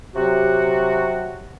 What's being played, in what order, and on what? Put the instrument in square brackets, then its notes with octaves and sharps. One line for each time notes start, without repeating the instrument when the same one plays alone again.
[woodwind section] C3 F#3 F#4 [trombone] G4